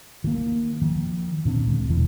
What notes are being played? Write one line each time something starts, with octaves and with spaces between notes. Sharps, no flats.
D#3 A#3
D#3 F3
A#2 D3 C4
D#2 G#3
E1 E2 B2 E3